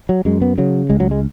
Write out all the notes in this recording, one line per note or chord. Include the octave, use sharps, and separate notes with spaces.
F#3
F#2 G#3
B3
C#3 F#3
C#2 G#3
F#3
G#3